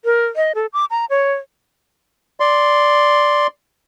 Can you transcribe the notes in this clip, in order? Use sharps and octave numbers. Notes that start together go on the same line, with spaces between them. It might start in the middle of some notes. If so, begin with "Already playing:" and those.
A#4
D#5
A4
D6
A#5
C#5
D5 C6